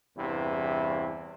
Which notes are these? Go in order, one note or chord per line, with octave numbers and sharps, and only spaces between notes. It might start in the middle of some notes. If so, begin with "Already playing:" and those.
E2 G2 C3 E4